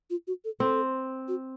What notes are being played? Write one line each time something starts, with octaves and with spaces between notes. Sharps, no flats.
F4
F#4
A4
C4 A4
F#4